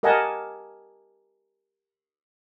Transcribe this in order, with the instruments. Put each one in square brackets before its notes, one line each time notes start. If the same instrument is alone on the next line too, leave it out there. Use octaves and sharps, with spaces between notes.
[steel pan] G4 A#4 D#5 F#5 G#5 A5